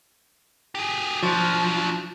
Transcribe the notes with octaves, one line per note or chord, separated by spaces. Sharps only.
G4 G#4
F3 F#3 D4